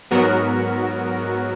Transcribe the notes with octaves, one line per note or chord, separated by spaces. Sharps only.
G#2 F#3 B3 F#4 A#4